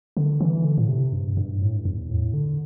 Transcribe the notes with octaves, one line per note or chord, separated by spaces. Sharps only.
D3
E3
D3
A2
C3
G2
G2
A2
G2
E2
A2
D3